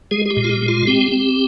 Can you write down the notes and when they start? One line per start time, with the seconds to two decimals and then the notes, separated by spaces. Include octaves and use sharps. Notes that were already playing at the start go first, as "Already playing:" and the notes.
0.11 G#3 G#4
0.26 G#4
0.30 G4
0.37 A#2
0.44 F4
0.49 G4
0.62 G#3
0.68 F4
0.87 C4 G4
1.12 C4